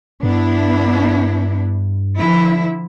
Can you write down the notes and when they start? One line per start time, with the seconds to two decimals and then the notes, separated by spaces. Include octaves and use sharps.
0.23 G2 B3 D4 E4
2.17 D3 F3 E4